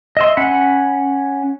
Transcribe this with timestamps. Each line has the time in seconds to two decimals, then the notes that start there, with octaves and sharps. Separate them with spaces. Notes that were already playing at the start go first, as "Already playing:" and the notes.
0.17 D#5 E5 C6
0.37 C#4 F#5 B5